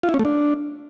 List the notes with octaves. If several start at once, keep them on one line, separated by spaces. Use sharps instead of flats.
F4
E4
C#4
A3
D4